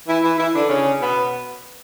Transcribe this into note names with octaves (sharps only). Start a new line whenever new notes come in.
E3 E4
E3 E4
E3 E4
D3 D4
C#3 C#4
B2 B3